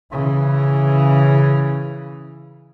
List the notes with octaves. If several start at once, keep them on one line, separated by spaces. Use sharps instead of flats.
C#3 E3